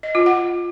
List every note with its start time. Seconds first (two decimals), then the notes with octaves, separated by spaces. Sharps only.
0.03 D#5
0.15 F4
0.26 F#5